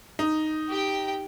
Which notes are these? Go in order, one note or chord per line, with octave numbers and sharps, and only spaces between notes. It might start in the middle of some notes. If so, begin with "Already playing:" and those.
D#4
G4 G5